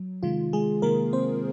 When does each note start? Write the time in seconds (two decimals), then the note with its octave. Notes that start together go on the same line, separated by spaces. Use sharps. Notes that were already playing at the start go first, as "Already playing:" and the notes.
Already playing: F#3
0.23 C3 D#3 G#3 F4
0.53 G#3 G#4
0.82 C3 D#3 G#3 A#3 A#4
1.13 C4 C5